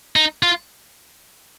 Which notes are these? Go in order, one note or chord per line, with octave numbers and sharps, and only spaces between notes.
D#4
F4